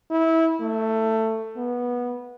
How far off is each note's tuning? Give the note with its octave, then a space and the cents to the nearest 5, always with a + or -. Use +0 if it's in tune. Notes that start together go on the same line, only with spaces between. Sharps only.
E4 -20
A3 +15
B3 -15